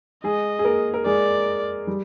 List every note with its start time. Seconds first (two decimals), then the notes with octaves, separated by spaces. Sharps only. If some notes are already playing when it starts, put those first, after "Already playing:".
0.24 G#3 G#4 D#5
0.59 G#4
0.64 A#3 A#4
0.94 A#4
1.06 G#3 G#4 D5
1.87 G3 G4